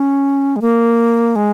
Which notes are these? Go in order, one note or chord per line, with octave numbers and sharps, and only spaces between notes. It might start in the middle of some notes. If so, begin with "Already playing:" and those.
Already playing: C#4
G#3
A#3
G#3